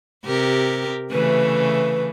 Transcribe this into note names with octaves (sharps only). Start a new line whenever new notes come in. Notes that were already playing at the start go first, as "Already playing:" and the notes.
C3 G4 A#4
C#3 E3 A3 B4